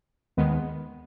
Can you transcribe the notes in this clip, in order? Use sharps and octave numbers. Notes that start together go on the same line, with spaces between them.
D#2 D#3 G#3 B3